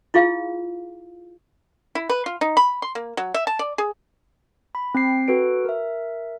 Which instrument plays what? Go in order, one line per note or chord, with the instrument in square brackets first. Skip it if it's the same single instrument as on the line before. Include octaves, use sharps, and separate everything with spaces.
[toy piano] E4 F4 G#4 F5
[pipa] E4
B4
F4
D#4
B5
C6
A#3
F#3
E5
A5
D5
G#4
[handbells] B5
C4 G5 C7
F#4 A4 B4 D7
A#4 E5